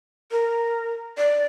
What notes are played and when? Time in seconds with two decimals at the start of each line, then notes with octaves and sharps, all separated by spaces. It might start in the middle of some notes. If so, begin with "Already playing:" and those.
0.31 A#4
1.17 D5